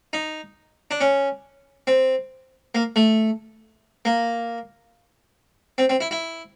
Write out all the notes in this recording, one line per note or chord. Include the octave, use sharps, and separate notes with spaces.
D#4
D4
C#4
C4
A#3
A3
A#3
C4
C4
E4
E4